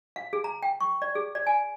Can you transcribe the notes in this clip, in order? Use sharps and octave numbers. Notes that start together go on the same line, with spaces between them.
F5
G#4
A#5
G5
C#6
D5
G#4
D5
G#5